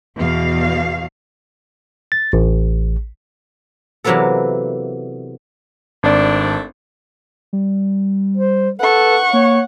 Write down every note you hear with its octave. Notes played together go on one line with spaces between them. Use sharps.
E2 B2 F5
A6
A1
C3 E3 F#3 A#3 B3 A4
G#1 A3 C4 D4 D5
G3
C5
A4 B4 F#5 C#6
A#3 C#5